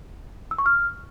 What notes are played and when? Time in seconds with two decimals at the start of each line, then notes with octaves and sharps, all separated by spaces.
0.51 E6
0.58 C#6
0.66 F6